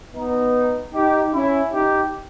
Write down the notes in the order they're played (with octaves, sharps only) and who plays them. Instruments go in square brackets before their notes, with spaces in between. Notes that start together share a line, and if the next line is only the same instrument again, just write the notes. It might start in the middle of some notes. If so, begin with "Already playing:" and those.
[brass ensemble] B3 D#4
D#4 G4
C#4 E4
D#4 G4